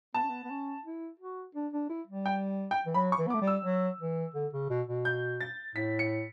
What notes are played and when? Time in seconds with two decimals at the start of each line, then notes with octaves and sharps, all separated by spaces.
0.14 B3 A5
0.23 C#4
0.29 B3
0.44 B3
0.50 C#4
0.85 E4
1.20 F#4
1.55 D4
1.73 D4
1.89 E4
2.07 G3
2.26 G5
2.71 G5
2.86 E3
2.94 F#3 B5
3.12 C#6
3.18 E3
3.27 B3
3.30 D6
3.34 A3
3.42 G3
3.47 E6
3.65 F#3
4.01 E3
4.35 D3
4.53 C#3
4.70 B2
4.87 B2
5.05 G6
5.41 A6
5.75 A2 B6
5.99 C#7